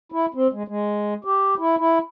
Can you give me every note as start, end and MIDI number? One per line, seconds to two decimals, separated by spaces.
0.12 0.26 64
0.34 0.47 60
0.53 0.63 56
0.68 1.14 56
1.25 1.54 67
1.58 1.76 64
1.78 1.98 64